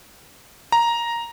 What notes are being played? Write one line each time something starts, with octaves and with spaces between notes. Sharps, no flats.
A#5